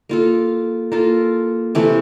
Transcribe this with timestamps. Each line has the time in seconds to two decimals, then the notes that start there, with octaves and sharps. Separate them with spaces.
0.09 A#3 F4 A4
0.92 A#3 F4 A4
1.75 C3 E3 A3